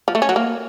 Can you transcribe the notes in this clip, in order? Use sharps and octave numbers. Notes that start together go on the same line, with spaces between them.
F3
A3
C#4
F#3
A#3